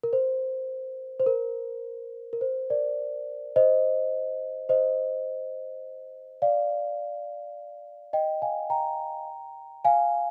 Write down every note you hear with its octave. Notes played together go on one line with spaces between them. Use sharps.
A#4
C5
C5
A#4
A#4
C5
A#4 D5
C5 D#5
C5 D#5
D5 F5
D#5 G5
F5 G#5
G5 A#5
F5 G#5